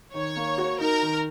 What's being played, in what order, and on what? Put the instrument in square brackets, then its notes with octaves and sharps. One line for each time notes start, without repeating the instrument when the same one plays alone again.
[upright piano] D#3 [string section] C#5
[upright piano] A#3
F#4
[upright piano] D#4 [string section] A#4
[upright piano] D#3